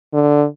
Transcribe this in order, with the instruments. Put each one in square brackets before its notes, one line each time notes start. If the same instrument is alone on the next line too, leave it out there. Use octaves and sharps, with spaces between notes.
[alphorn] D3